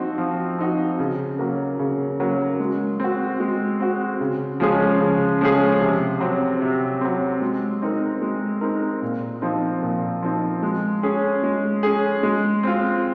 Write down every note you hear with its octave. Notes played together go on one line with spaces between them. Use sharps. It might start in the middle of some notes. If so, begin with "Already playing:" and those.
Already playing: F3 C4 D#4 F#4
F3
C4 D#4 F#4
C#3
F#3 A#3
C#3
F#3 A#3
G#3
C4 F#4
G#3
C4 F#4
C#3
F3 G#3 C#4 G#4
C#3
F3 G#3 C#4 G#4
C3
F#3 C4
C3
F#3 C4
G#3
C4 D#4 A#4
G#3
C4 D#4 A#4
A#2
F3 C4 D#4
A#2
F3 C4 D#4
G#3
C#4 G#4
G#3
C#4 G#4
G#3
C4 F4